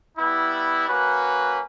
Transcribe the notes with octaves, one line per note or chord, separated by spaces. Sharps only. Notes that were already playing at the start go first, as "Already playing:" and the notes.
G3 B3 E4
A#3 C#4 F#4 B4